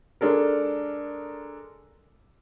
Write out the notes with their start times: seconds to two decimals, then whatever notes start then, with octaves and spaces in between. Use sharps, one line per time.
0.21 G#3 D4 A4 A#4